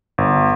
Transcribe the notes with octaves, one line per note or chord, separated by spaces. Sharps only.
G1